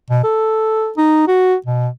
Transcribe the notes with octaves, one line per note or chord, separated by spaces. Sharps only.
B2
A4
D#4
F#4
B2